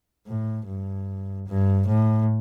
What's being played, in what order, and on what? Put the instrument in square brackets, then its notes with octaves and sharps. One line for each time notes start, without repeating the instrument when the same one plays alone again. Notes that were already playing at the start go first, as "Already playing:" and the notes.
[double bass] A2
G2
G2
A2